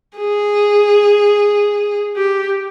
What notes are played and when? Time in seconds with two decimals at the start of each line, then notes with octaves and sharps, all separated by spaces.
0.17 G#4
2.17 G4